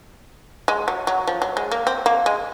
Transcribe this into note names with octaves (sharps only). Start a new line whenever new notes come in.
G#3
F#3
F#3
F3
F#3
G#3
A#3
C4
A#3
G#3